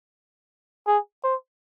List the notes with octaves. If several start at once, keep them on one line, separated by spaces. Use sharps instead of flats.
G#4
C5